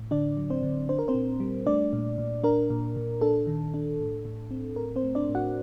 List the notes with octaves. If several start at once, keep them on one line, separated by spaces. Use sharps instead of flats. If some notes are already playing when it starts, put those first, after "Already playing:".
Already playing: A2
D3 D4 D5
F#3
C4 C5
D3
D4 C5
A#4
C4 C5
A#2
G3
A3 D4 D5
A#2
A#2
D4 A#4
A#2
A#2
D4 A4
D#3
D4
A2
A2
C4
A2 A#4
C4 C5
A3
D4 D5
A2
F#4 F#5